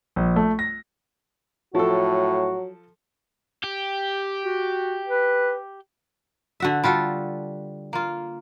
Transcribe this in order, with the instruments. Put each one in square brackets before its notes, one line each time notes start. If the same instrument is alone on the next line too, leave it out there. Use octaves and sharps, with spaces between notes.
[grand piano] A#1
A3
A#6
[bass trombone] A2 [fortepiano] F3 A4 [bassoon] F#3 [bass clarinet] F#4
[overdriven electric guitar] G4
[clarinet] F#4
B4
[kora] D3 F#4 E5
G3 F4 F#4 A4
A#3 F4